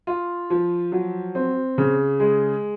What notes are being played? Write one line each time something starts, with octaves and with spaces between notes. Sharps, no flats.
F4
F3
F#3
C4
C#3
G#3